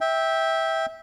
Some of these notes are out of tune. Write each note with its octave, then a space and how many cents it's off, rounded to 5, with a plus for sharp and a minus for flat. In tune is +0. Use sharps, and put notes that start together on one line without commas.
E5 -15 G5 +5